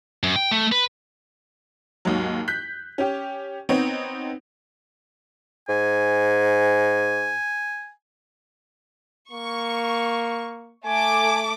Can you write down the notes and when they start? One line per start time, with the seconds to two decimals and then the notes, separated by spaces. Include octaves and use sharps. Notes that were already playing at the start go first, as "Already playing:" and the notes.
0.23 F#2
0.36 G5
0.51 A3
0.72 B4
2.05 D#2 G#2 F#3
2.48 F#6 G6 B6
2.98 C#4 G4
3.69 B3 C4 D#4 C#5
5.69 G#2 G#5
9.31 A#3 C#6
10.85 A3 G#5 D6